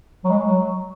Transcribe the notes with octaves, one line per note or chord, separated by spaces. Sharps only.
F#3
G#3
F#3